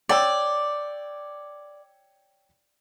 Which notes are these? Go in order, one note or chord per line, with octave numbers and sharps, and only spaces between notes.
C#5 D5 G5 E6